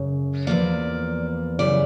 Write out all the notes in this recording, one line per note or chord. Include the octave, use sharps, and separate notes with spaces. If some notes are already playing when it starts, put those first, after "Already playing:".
Already playing: F#2 C#3
E2 C#3 F3 A#3 D5
F#2 C#3 E3 G3 D5